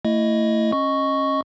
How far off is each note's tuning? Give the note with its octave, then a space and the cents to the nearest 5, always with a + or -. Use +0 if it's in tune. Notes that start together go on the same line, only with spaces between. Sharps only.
A3 +30 E4 +10 D#5 +0
C#4 -25 D#5 +0 C#6 +0